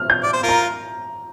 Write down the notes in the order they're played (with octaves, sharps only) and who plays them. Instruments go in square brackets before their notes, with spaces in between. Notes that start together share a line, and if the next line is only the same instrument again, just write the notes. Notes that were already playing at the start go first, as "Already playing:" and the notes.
Already playing: [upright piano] F6
G6
[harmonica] D5
C5
F4 A#4
[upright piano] A#5